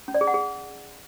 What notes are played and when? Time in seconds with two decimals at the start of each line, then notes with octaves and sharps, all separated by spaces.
0.08 C#4
0.14 D5
0.21 G#4
0.27 F#5
0.34 G#4